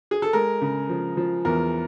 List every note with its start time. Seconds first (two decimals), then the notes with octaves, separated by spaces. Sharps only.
0.11 G#4
0.22 A4
0.33 G#3 A#4
0.61 C#3
0.89 F3
1.17 F3
1.45 E2 A#4